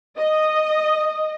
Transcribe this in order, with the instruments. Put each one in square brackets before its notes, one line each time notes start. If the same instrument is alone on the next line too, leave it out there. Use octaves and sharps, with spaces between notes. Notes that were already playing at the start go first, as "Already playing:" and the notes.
[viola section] D#5